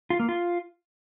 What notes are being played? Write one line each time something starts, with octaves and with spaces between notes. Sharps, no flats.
F4
A#3
F4